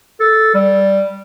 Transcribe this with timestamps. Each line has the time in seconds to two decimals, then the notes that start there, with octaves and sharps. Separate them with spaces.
0.20 A4
0.55 G3